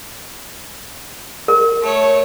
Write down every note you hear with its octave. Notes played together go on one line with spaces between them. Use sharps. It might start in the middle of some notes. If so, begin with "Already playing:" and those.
A#4
A3 C#5